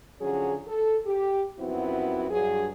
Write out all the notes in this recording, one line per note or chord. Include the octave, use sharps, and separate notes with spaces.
D3 F3 F#3 C#4 G#4
A4
G4
F#2 F3 B3 C4 E4 F#4
G2 F#3 G#4